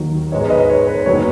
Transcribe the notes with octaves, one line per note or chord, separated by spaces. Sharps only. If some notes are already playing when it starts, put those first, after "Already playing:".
Already playing: D#2 D#3 F#3 D#4
G#2 G#3 B3 D#4 C#5
B4 D#5
C#5
B4
F#1 F#3 B3 C#5